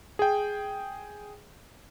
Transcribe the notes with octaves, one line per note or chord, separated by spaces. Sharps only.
G#4 G5